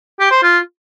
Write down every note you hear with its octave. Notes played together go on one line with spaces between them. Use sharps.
G4
C5
F4